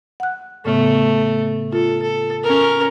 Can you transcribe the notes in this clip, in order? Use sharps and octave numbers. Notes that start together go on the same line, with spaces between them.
F#5 F#6
A2 C#3 A3 B3
F4 A4
A4
C#4 A#4